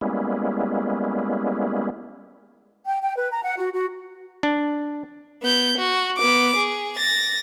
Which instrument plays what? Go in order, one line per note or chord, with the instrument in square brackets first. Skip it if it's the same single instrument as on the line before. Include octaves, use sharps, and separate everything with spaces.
[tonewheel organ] G3 G#3 A#3 B3 C#4 E4
[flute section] G5
G5
B4
A#5
F#5
F#4
F#4
[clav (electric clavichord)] D4
[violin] B3 G6
F#4
B3 D6
G#4
A6 A#6